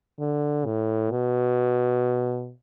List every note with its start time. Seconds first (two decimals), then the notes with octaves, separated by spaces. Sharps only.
0.19 D3
0.66 A2
1.11 B2